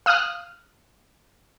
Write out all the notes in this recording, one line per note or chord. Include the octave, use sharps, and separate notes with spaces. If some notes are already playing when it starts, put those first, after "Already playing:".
F5 D#6 F6 F#6